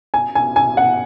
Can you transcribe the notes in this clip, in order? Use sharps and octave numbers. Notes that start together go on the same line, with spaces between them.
G#5
G#5
G#5
F#5